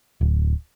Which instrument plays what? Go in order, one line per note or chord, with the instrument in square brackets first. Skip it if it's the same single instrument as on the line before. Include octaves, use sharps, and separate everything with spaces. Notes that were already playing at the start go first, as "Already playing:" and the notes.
[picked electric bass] D1